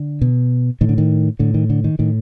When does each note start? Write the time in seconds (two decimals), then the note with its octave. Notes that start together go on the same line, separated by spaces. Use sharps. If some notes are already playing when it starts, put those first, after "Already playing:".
Already playing: D3
0.21 B2
0.81 A2 D#3
0.89 D3
0.98 D#3
1.39 A2 D3
1.54 D#3
1.70 D3
1.84 D#3
1.99 A2 D#3